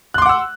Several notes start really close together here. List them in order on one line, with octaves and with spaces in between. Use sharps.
F#6 C6 D6 F#5 E6